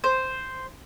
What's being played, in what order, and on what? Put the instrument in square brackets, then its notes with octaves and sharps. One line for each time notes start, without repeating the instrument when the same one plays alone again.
[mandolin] C5